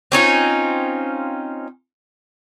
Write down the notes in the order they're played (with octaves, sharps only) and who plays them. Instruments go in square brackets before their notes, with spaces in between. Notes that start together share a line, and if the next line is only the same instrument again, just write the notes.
[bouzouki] C4 C#4 D#4 F4